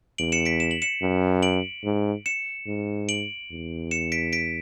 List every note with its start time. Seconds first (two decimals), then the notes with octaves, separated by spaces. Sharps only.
0.18 E2 D7 F#7
0.32 C#7 E7
0.45 B6 D7
0.60 E7
0.71 F#7
0.82 C#7 E7
1.02 F#2
1.43 D7 F#7
1.84 G#2
2.26 C#7 E7
2.66 G#2
3.09 D7 F#7
3.51 E2
3.91 C#7 E7
4.12 B6 D7
4.33 B6 D7